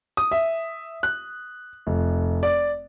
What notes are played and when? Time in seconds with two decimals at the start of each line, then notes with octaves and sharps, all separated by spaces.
0.17 D#6
0.31 E5
1.03 F#6
1.87 F1
2.43 D5